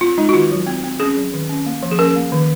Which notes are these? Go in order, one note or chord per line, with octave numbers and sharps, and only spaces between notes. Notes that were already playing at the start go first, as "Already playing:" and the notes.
C4 F4
G#3 D#4
F#4
D#3 F4
F#3
C4
C4
C#4 G#4
F#3
D#3
C#4
A#3
F3
G#4
C#4 A#4
A#3
D#3